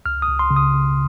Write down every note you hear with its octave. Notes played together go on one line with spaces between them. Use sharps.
C#2 F6
D#6
C#2
C6
C#3
D#6
C#3